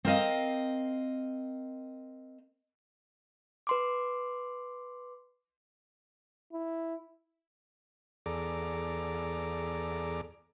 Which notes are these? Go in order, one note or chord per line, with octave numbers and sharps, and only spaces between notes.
C4 A#4 D#5 F5
B4 C6 D6
E4
E2 G#4 A4 D5 A#5 D6